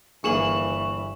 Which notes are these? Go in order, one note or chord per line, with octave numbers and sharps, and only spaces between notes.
G1 E3 A#3 G#4 C#6 E7 F#7